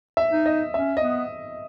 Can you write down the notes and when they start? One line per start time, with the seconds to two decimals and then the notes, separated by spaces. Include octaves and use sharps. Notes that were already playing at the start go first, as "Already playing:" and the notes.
0.17 E5
0.31 D#4
0.46 D#5
0.74 C#4 E5
0.97 D#5
1.03 B3